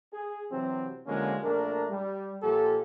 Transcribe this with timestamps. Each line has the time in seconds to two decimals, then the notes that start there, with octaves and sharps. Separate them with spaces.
0.13 G#4
0.52 C3 E3 F#3 C4
1.07 D3 F3 G3 G#3 A#3 C#4
1.43 A#1 A3 D4 A#4
1.91 G3
2.43 A#2 F3 G4 A4